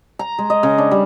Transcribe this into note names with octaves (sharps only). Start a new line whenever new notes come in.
A#5
G#3
D#5
C#3
D4
G3